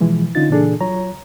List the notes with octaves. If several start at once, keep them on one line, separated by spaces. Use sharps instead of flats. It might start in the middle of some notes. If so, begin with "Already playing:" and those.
B2 E3 F3 G#3
D3 C#4 D#4 F4 A6
A#2 C#3 E3 D4 G#4 A4
F#3 F4 C#5 A#5